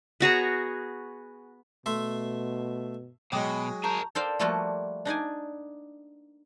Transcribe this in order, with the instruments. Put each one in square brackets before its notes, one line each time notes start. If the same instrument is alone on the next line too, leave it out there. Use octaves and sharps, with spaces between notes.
[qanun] B3 F#4 G#4 A#5
[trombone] B2 [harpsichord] A3 E5 C6
[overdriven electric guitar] B2 [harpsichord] F#3 G#3 [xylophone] G5 D6 D#6
[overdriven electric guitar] G#4 A#4 [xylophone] A5 C#6 G6 [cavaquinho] A#5
[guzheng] A4 A#4 C5 D5 F5 G5
F3 G3 A3 A#3 F4 F#4
D4 D#4 D5 G#5